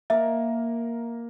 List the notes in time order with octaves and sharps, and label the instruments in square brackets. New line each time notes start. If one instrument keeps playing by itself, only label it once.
[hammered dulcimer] A#3 A#4 [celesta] E5